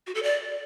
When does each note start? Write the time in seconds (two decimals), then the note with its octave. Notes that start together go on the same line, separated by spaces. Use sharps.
0.07 F#4
0.15 A4
0.23 D5